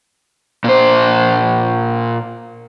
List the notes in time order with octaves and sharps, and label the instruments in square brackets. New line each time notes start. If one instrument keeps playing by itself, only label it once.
[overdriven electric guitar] A#2 C5